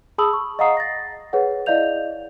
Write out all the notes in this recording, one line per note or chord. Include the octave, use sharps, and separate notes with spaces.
G#4 A5 B5 D#6 E6 F#7
C#6
D#5 F5 F#5 A#5 D#6 C7
A6 A#6
G#4 B4 C#5 F#5
E4 D5 D#5 F5 G6 F7